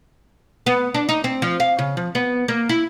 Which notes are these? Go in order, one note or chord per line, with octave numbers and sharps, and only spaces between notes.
B3
D4
D#4
C4
F3
F5
C#3
F3
B3
A#3
E4